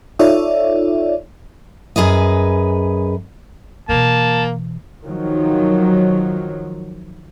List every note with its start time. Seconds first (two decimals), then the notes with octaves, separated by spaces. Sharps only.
0.19 D#4 F4 A4 C#5 D5 E5
1.96 F#2 G#4 B4 D#5
3.89 B2 E3 A#3 A5
5.05 D#3 F3 F#3